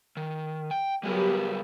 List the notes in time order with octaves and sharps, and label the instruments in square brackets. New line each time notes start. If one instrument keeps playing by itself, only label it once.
[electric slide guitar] D#3
G5
[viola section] F#3 B3 G4 [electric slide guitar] G3 G#4 A#4